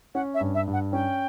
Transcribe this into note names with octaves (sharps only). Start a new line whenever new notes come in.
C#4 F#5
E5
G2
E5
G2
F#5
C#4 G5